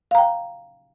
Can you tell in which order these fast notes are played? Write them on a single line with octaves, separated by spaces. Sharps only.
F5 A#5 G5